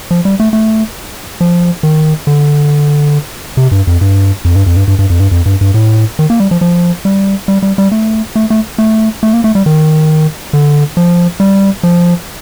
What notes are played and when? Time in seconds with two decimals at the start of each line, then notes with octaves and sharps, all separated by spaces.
0.11 F3
0.25 G3
0.40 A3
0.53 A3
1.41 F3
1.83 D#3
2.27 D3
3.57 C3
3.72 G2
3.87 F2
4.01 G2
4.45 F2
4.55 G2
4.66 F2
4.77 G2
4.88 G2
4.99 G2
5.10 F2
5.20 G2
5.31 F2
5.46 G2
5.61 G2
5.74 A2
6.19 D#3
6.30 A#3
6.40 G3
6.51 F3
6.61 F3
7.05 G3
7.48 G3
7.63 G3
7.78 G3
7.92 A3
8.36 A3
8.50 A3
8.78 A3
9.23 A3
9.33 A#3
9.44 A3
9.55 G3
9.66 D#3
10.53 D3
10.97 F3
11.40 G3
11.83 F3